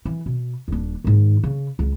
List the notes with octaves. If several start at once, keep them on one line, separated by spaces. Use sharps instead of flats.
E3
B2
D#1 D4
G#2 D#3
C#3
C#2